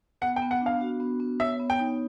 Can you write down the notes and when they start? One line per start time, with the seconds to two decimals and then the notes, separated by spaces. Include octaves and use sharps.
0.22 B3 F#5
0.36 G5
0.42 B3
0.51 F#5
0.61 D4 F5
0.81 F#4
1.00 B3
1.20 B3
1.40 C#5 E5
1.59 B3
1.70 G5
1.80 D#4